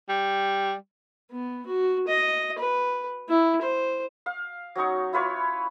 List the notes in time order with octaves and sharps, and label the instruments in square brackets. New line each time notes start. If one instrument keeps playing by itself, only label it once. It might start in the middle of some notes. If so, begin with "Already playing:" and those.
[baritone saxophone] G3
[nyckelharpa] B3
F#4
D#5
B4
E4
C5
[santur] F5
F#3 C#4 D#4 C#6
E4 F4 B4 C#5